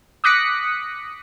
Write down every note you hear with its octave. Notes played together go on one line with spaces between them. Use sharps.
D6 D#6 F#6 A#6 B6 C#7